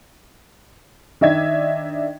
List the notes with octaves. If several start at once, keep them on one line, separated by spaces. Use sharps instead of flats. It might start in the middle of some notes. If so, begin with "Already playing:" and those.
D#3 D4 D#5 E5 G#6